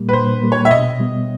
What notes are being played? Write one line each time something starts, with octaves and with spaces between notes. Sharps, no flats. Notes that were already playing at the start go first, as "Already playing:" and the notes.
Already playing: A#2 G3 A#3
B4
A#2 C5
G3 A#3
C#5
E5
B2 D#5
G3 B3